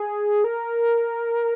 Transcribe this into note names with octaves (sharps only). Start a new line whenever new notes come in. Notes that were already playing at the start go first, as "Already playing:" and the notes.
Already playing: G#4
A#4